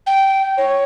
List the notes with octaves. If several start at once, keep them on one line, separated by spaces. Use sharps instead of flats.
G5
C#5